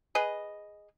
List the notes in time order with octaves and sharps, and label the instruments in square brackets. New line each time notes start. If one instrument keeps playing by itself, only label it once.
[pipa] G#4 B4 D#5